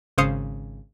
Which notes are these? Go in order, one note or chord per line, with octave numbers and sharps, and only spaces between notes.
G#1 C#3 C5 F5 D#6 C#7